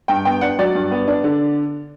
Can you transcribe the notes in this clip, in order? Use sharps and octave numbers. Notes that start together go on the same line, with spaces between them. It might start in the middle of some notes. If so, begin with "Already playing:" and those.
G2 G5
B3 G5
D4 F#5
F#3 D5
G2
B3
D4
D3